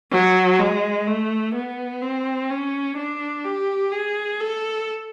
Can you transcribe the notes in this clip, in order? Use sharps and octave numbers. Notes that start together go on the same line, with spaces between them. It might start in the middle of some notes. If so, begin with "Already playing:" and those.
F#3
G#3
A3
B3
C4
C#4
D4
G4
G#4
A4